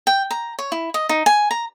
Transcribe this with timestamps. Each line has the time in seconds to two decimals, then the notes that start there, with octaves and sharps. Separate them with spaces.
0.07 G5
0.31 A#5
0.59 C#5
0.72 E4
0.94 D#5
1.09 D#4
1.26 G#5
1.51 A#5